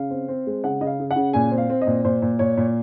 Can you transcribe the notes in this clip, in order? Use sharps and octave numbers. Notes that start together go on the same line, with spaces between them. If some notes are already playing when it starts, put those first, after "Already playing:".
Already playing: C#3 F5
C4
C4
G#3
C#3 F#5
C#3 D#5
F5
C#3
F#5
C#3
A#2 G#5
C4
F5
C4
D#5
A#2
A#2 C5
A#2
A#2 C#5
A#2